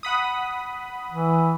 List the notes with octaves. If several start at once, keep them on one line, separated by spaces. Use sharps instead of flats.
F#5 B5 D#6
E3